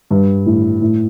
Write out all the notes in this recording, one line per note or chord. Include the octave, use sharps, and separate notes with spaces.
G2
A2
A2